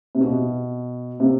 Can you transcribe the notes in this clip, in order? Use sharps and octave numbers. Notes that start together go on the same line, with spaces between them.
C3
B2
C3